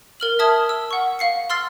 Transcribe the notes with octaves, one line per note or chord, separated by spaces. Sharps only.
A#4 F6 F#7
E5 A5 D#6 F6 G#6
E6
F#5 C#6
F5 C7 C#7
C6 E6 F6 A6 C7